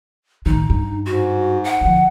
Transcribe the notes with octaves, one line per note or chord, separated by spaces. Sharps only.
A1 D#3 D#4
G2
G#2 F#4
F#5
D3 F3